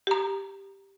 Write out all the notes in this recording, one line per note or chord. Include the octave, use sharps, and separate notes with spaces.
G4 A#5